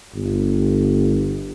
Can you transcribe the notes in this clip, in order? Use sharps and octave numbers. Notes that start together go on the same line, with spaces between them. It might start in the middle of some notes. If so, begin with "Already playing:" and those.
G1